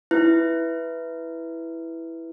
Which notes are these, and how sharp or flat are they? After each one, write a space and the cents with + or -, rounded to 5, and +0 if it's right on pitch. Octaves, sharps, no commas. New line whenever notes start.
E4 +0 B4 +0